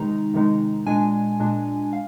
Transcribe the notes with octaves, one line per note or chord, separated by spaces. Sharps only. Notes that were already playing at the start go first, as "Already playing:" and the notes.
Already playing: C3 D#3 G#3 D#4 A#5
C3 D#3 G#3 D#4
A#2 G#3 D4 G#5
A#2 G#3 D4
F5